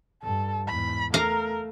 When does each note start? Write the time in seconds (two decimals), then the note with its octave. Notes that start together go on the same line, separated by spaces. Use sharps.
0.23 G2 A4
0.67 E2 G#2 B5
1.14 A3 A#4 F5 A#5